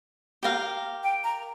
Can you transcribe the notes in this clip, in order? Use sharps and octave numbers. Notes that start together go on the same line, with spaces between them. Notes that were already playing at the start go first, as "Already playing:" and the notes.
G4 A#4 F5
G5
A#5